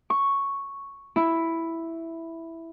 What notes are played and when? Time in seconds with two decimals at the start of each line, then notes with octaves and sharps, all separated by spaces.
0.10 C#6
1.16 E4